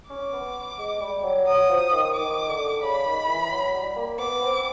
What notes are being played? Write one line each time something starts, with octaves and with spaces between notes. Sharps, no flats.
C#4 D6
B3
G#3
G3
F#3
F#3 D#6
F3
D#3
D#3 D6
D3
C#3 B5
D#3
E3
F#3
G3
A#3
B3 D6
C4